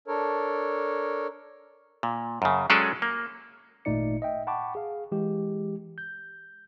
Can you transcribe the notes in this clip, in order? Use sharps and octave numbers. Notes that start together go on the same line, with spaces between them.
D4 A4 A#4 C#5
A#2
F#2 C#3
F#3 G#3 C#4 G#4 A4 D5
A#3
G#1 A#2 A3 D#4 D5 C#7
D#5 E5 G5
F#5 G5 A5 B5 C#6 D6
G#4 F5
E3 G#3 G4
G6